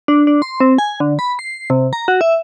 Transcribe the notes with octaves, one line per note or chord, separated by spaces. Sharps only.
D4
D4
C6
C4
G#5
D3
B5
C7
C3
A#5
F#4
E5